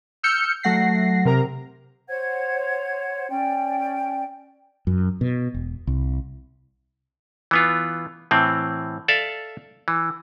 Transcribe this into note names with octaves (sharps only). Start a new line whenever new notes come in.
E6 F6 G6 C#7
F#3 A3 F#5 A#6 C7
C3 A#4 A#5
C5 C#5 F#5 G#6
C#4 D5 G5
F#2
B2
E1
C2
E3 B3 F4
A2 E3 C4
A4 D5 E5 F5
E3